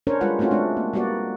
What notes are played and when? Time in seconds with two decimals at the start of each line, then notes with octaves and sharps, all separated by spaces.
0.07 C#4 D4 A#4 C5 C#5
0.21 G3 G#3 F4 B4 F#5
0.39 A3 C4 C#4 F4 F#4
0.51 G#3 A3 C4 D4
0.77 A#3
0.93 G3 A#3 B3 F#4 D5